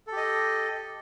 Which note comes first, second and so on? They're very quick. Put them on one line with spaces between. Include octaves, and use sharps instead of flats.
A4 G4 D#5